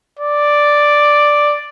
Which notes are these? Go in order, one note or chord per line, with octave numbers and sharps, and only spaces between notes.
D5